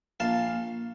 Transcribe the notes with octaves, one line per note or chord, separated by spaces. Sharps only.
A#1 F5 A5